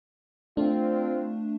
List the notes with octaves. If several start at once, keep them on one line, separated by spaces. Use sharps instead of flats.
A3 C4 D4 F4